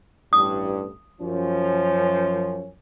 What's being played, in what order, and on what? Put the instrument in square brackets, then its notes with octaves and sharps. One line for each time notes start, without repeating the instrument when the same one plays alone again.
[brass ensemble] A1 G2 [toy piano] D#6
[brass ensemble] F#2 F3 C#4